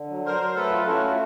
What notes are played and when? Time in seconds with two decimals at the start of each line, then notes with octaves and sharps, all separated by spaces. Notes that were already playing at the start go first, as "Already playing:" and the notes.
Already playing: D3
0.10 F#3
0.25 F#3 A#4 C5
0.40 F#3
0.56 A3 A4 B4
0.72 F4
0.87 C#4 E4 F#4
1.02 A3